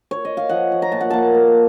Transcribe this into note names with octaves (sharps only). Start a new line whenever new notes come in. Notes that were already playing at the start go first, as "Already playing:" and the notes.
C#5
D#5
F5
F3 F#5
F3
A#5
A#2 A5
F#5
A#3 A5
A#3